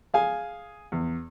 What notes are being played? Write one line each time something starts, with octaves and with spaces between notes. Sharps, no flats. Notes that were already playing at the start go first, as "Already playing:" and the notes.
G#4 F5 G#5
E2